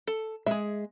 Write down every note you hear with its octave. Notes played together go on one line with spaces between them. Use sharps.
A4
G#3 G#4 E5